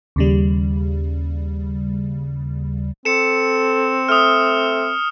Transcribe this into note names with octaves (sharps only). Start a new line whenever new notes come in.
D#2 C#3 G3
C4 A4 C#7 E7
A3 D#6 F6